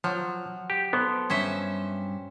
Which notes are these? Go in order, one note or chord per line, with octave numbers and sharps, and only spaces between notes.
F3 F#3
G4
B3 A4 C5
G2 C#4 C5 E5